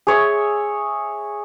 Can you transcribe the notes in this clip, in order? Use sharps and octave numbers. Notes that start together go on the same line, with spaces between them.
G#4 C#5 E5